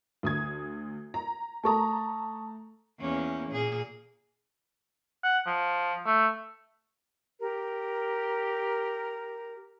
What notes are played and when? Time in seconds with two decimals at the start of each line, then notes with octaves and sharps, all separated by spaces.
0.23 D2 D#6 G#6
1.14 A#5
1.64 A3 A4 A5 A#5 C#6 D#6
3.00 E2 A#3 C#4
3.51 A#2 G#4
5.24 F#5
5.47 F3
6.06 A3
7.39 G4 A#4